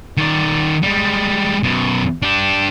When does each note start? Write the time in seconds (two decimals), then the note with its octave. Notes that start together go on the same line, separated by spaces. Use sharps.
0.17 D#3 D5
0.83 G3 G#3
1.63 F#2 B2
2.22 D4 G4